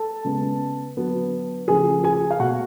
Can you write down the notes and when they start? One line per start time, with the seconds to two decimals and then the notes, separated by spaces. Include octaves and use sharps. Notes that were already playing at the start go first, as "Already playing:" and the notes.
Already playing: A4 A5
0.25 C#3 G#3 B3
0.97 D3 F#3 B3
1.68 C#3 F3 A3 G#4 G#5
2.04 G#4 G#5
2.31 F5
2.39 B2 A3 F#4 F#5